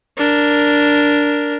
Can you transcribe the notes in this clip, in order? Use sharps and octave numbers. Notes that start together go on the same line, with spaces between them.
D4 A#4